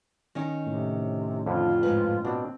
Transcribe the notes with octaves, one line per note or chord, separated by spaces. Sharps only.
D#3 C#4 D#5
A2 C3
F2 D3 F4
G#2 B4
B2 C4 D4